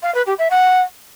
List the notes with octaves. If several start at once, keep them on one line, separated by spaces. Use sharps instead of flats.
F5
B4
G4
E5
F#5